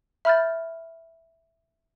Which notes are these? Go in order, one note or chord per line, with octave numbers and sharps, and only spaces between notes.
E5 B5 F6 G6 A6